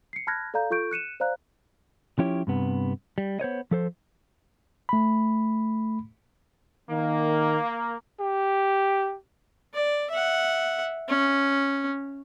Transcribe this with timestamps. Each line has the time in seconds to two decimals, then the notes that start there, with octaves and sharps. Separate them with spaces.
0.13 C7 C#7
0.27 A5 B5 F6 F#6 G#6 A#6
0.54 A4 D5 F5 A#5 G6
0.70 F4 A4 C#6 G6 D7
0.91 F#6 C#7 D#7 E7
1.20 C5 D5 F5 A#5 F#6
2.19 F3 C#4 E4 G4 C#5
2.47 G2 C3 B3
3.18 G3
3.40 B3 C5 C#5 D#5
3.71 F3 A4 C5
4.89 A3 B5
6.90 D#3 A#3
8.19 G4
9.74 D5
10.11 E5 F#5
11.09 C#4